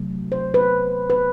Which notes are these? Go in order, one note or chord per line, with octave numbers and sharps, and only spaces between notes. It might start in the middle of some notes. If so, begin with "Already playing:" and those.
Already playing: C3 F#3 A3
C5
B4
B4